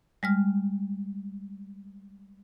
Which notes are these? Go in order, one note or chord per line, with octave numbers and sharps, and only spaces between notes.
G3 G#3 F6